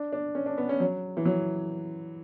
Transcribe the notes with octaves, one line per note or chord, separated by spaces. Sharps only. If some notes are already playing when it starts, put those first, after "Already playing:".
Already playing: D4
D4
C#4
D4
B3
C#4
F#3
E3
F#3